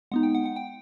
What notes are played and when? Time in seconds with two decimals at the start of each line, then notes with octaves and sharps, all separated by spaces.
0.12 G#3 B3 D#4 F#5
0.23 G5
0.35 F#5
0.46 F#5
0.56 G5